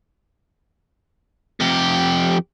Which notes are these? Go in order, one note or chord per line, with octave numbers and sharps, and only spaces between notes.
F2 G4